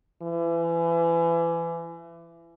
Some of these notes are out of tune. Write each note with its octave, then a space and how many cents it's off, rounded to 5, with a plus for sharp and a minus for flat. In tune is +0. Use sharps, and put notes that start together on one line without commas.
E3 +30